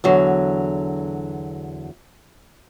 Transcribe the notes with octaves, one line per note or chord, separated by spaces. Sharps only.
E2 D3 F#3